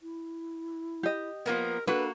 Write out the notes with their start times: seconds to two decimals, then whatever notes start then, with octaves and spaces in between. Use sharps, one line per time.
0.02 E4
1.03 G4 D#5
1.46 F3 A#3 B3 A#4
1.87 A#3 D4 F#4 A4 B4